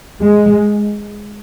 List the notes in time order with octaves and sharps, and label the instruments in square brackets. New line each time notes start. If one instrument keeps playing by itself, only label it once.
[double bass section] G#3